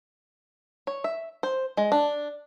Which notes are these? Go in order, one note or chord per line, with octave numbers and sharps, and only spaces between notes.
C#5
E5
C5
G#3
D4